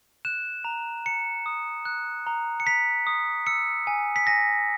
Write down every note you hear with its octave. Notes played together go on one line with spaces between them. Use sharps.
F#6 E7
A#5
A#5 C#7
D#6
F#6
A#5
C#7
A#5 B6
D#6
E6 C#7
G#5
B6
G#5 A#6